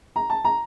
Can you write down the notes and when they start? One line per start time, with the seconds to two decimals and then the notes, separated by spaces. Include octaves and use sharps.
0.16 A#5
0.30 A5
0.45 A#5